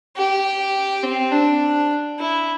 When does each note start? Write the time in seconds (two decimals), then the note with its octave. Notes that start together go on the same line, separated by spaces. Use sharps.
0.17 G4
1.03 C4
1.32 D4
2.19 E4